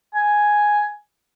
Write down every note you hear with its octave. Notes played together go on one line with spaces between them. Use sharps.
G#5